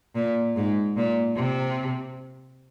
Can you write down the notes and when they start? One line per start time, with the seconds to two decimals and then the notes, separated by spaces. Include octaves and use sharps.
0.15 A#2
0.56 G#2
0.97 A#2
1.37 C3